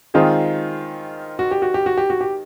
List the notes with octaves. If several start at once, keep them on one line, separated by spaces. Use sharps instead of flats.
D#3 G#3 C4 D#4 F4 G#4
F#4
G4
F#4
G4
F#4
G4
F#4
G4